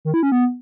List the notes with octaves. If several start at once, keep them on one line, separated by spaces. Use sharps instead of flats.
D#3
E4
C#4
B3